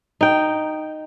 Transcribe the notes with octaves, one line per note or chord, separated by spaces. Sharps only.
D#4 G5